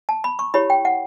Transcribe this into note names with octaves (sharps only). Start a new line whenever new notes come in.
A5
B5
C#6
E4 G4 C#5 B5
G5
F#5